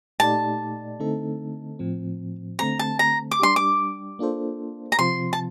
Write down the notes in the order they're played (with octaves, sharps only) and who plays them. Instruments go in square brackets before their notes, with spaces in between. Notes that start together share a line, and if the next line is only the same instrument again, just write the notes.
[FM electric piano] A#2 A3 D#4 G4 D5 [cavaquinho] A5
[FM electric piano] D3 A3 C4 D#4 A4
A2 F3 C4
[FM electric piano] D3 A3 C4 [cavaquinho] A#5
[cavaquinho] A5
A#5
D6
[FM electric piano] G3 D4 G4 [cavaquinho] C6
[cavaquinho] D6
[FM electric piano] A#3 D4 F4 A4 C5
[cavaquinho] A#5
[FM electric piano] C3 F3 C4 F4 C5 [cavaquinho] C6
[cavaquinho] A5